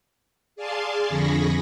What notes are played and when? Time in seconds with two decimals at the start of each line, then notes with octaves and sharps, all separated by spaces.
0.56 G#4 D5 F5 G#5 A5 C6
1.09 F2 D3 G#4 B5 C#6 A#6